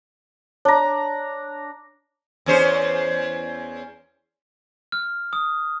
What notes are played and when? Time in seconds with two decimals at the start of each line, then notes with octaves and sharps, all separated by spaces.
0.65 D4 C#5 A#5
2.46 E2 C#4 C5
4.92 F6
5.33 D#6